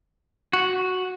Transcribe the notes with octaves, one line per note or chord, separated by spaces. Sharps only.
F#4